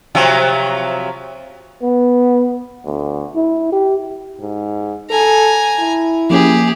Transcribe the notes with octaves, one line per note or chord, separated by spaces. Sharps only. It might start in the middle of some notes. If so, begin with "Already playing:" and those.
C3 F3 F#3
B3
D2
E4
G4
G#2
A4 G#5 A#5
E4
F3 A#3 C#4 G4 G#4